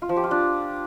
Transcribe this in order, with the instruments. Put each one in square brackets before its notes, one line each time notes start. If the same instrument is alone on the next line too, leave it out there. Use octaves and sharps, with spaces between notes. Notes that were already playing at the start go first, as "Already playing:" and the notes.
[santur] F4
F3
G4
F4
D4